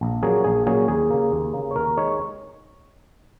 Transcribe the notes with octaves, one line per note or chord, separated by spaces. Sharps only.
A#1
A#2 F#3 A#3 C#4 G#4
A#1 G#4
A#2 F#3 A#3 C#4 G#4
D#2 G#4
C#3 A#3
D#2
C#3 A#3
C#5
D#2 A#4
D#3 G#3 D#4 C#5